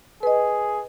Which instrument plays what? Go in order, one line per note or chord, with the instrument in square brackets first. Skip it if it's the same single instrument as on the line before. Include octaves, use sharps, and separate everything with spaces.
[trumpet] G#4 [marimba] B4 D#5